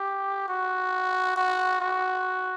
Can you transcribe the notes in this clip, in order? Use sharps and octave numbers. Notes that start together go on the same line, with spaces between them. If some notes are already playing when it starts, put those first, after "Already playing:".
Already playing: G4
F#4
F#4
F#4